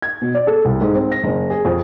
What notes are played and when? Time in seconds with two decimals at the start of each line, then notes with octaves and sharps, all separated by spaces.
0.02 G#6
0.22 B2
0.35 D5
0.47 A4
0.65 C2
0.81 G#2
0.95 C4
1.12 A#6
1.24 F#1
1.50 G#4
1.65 F2